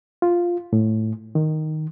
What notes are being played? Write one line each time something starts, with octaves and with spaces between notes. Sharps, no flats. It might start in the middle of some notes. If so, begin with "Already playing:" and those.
F4
A2
D#3